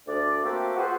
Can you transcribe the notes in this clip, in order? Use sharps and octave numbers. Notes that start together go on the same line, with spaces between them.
D2 D5
A3 A#3 C4 F#4 G4 A4
F4 F#4 G#4 B4 C5 C#6